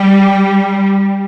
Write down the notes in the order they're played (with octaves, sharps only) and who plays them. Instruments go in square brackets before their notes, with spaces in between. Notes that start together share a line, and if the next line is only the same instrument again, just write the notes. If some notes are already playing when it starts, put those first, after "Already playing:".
Already playing: [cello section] G3